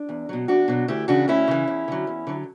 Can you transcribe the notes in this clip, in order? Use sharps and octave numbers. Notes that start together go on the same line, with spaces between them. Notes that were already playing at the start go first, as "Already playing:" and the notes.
Already playing: D4
E2
B2 F#3
E2 D4 F#4
B2 F#3
D2 E4 G4
C#3 E3 D4 F#4
D2 C#4 E4
C#3 E3
E2
D3 F#3
E2
D3 F#3